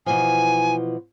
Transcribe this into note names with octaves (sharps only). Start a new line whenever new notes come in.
B2 E3 F3 G#5